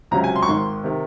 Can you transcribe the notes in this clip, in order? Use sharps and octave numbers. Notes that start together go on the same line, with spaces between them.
C#2 C3 F#3 C#4 A#5
G#5
C6
C#6
G#1 G#2 D#3 C6
C3 D#3